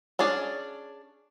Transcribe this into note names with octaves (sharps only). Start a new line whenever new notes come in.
C#4 D4 G#4 D5